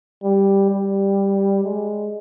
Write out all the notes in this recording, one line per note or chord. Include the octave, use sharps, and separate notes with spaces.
G3
G3
G#3